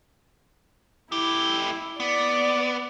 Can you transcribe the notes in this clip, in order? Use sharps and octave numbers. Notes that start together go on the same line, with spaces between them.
A3 E4 G4
B3 D5